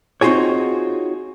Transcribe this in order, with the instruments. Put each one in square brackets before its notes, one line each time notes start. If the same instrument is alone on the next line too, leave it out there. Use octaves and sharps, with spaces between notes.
[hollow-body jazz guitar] C4 D#4 F4 F#4 G#4 C#5